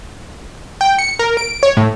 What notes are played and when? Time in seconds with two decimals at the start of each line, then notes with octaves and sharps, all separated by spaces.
0.81 G5
0.99 C#7
1.19 A#4
1.37 D7
1.63 C#5
1.77 A2